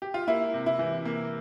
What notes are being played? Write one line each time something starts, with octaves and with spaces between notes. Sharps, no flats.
G4
F4
A#3 E4
C3
E4
E3
C3 A#3